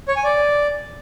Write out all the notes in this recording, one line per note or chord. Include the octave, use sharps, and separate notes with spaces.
C#5
G#5
D5